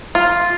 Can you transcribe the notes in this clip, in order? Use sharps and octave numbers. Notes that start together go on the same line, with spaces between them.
F4